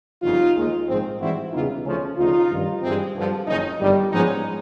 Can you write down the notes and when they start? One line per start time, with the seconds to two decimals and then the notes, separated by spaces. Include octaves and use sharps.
0.22 G1 F2 C#3 F#3 D#4 F4
0.55 D#2 D#3 G#3
0.88 A#1 G#2 D#3 G#3 C4
1.20 G#2 E3 G3 C4 E4 F#4
1.53 E2 C#3 E3 G3 B3 D#4 F4
1.85 D2 C#3 F3 A3 C#4
2.17 D2 C#3 F3 D#4 F4
2.50 A1 G2 D#3
2.83 G2 E3 G#3 C4
3.15 G2 D3 F3
3.47 F#1 F#2 D#3 C#4 D#4
3.80 G1 G2 D#3 G3
4.13 G#2 F3 G#3 B3 C#4 D#4